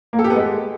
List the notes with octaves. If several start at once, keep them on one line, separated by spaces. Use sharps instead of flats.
A#3
A4
G4
B3
G#3